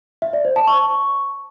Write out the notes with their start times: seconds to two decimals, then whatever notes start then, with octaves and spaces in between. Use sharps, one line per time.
0.22 E5
0.33 D5
0.45 C5
0.56 A5
0.67 C#6